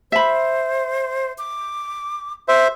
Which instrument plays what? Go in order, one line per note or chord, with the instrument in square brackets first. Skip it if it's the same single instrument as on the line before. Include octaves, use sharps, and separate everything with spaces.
[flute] C5 [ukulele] E5 B5
[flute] D6
[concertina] C5 E5